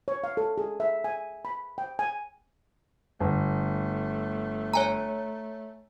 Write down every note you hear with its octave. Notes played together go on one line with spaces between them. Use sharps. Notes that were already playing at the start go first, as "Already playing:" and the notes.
C#5
F5
A4
G#4
E5
G#5
B5
G5
G#5
G1 A3
C#5 G#5 A#5